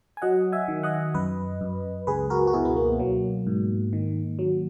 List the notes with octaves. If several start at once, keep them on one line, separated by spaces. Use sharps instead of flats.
G#5
F#3 D#5 F#5
E5 G#5
D#3
D#5 F#5
F#2 B4 D#5
F#2
C#2 G#4 B4
F#4 A#4
F#4
B2 E4 G#4
B3
A#3
F#3
G#2
D#3
F#3